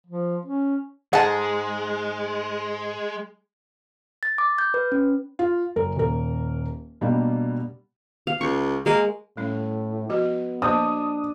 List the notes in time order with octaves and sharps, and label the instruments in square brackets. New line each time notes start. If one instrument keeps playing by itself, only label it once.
[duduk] F3
C#4
[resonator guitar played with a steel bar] G#2 G#4 [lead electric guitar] G#3 [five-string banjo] F#5 A5
[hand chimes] A6
D6
G6
B4
C#4
[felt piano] F4
F#1 A#4
D#1 A#4
B2 G3 A#3 D4 G4
[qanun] F5
[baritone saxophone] C#2 [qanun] C#6
[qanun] G#3 [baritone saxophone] A#3
[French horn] A2 [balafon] G3 C#4
[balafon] F3 F#4 G4 [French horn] B3
[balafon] F3 A#3 C5 [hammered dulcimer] D4 [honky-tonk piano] D#6